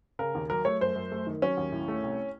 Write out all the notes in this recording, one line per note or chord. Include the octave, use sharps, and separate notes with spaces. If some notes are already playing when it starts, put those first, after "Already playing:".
C#3 A#4
D#2
F#3 A#4
A3 C#5
F#2 C5
F#2
A3
D#3
F#3 C#4
D#2
A2
A3
C2